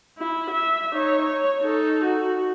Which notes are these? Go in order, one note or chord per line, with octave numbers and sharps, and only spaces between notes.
E4
E5
D#4 C#5
C#5
D#4 A4
F#4